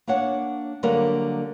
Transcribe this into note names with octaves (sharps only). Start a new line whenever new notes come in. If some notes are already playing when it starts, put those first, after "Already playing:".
A#3 D4 C#5 F#5
D3 F#3 G3 A#3 A#4